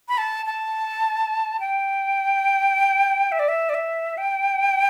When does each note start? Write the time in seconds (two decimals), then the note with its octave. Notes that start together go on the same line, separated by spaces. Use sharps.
0.08 B5
0.18 A5
0.46 A5
1.60 G5
3.32 E5
3.39 D5
3.48 E5
3.69 D5
3.74 E5
4.18 G5